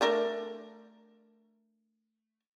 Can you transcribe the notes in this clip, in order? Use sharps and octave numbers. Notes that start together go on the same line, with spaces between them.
A3 D4 A#4